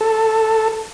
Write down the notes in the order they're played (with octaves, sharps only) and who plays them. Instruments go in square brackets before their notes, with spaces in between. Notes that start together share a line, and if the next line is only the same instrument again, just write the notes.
[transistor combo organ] A4